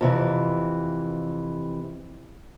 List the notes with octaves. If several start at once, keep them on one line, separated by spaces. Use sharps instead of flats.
F2 C3 E3